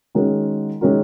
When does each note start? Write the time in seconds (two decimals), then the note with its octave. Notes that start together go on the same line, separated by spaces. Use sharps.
0.15 D#3 G#3 C#4 F#4 A#4
0.81 D#3 G#3 C#4 F#4 A#4